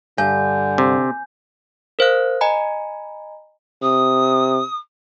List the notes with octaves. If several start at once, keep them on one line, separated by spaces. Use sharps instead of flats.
G2 D3 G#5 G6
C3
A#4 C5 F5 F#6
D#5 G#5 A#5 B5
C3 D#6